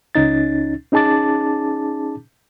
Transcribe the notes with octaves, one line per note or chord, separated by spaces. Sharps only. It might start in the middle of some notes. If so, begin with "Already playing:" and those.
C#2 C#4 D#4 A6
C#4 D#4 G#4 A5 D6 A6